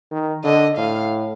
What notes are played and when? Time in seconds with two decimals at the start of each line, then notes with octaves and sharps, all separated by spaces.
0.12 D#3
0.44 D3 D#5
0.77 A2 F5